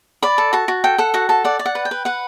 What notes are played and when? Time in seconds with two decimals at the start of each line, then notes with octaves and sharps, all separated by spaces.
0.23 D5 B5
0.38 A4
0.53 F#4 A5
0.68 F#4
0.84 A4 G5
0.98 A4 F#5
1.14 F#4 F#5
1.29 A4 A5
1.44 D5 F#5
1.59 D5
1.66 F#5
1.75 B4
1.85 G5
1.91 B4
2.05 B4 F#5